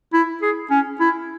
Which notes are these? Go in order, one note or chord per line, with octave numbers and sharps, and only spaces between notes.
E4
G#4
C#4
E4